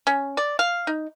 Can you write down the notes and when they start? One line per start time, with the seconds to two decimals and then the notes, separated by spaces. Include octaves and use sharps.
0.07 C#4
0.37 D5
0.59 F5
0.87 D#4